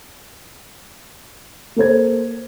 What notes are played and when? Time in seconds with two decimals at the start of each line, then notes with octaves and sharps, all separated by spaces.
1.76 A#3 A4 C5 G#6